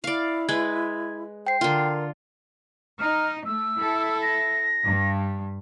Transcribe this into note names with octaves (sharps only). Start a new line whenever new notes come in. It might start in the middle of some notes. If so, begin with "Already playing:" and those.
E4 D5 F5
G#3 B4 G#6
C5 G5 C7
D3 F4 A#4
D#4 F6
A3 E6
E4 A4
A#6
G2